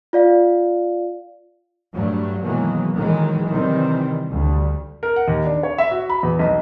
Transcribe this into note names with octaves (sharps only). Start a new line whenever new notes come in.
F4 D5 F5
G2 F#3 G3 A3
B2 D#3 E3 F#3 G#3 A#3
D#3 E3 F#3 G#3
C3 D#3 E3 G3 C4
D2 G3
A#4
F#5
D#2
D4
C#5
E5
F#4
B5
E2
B1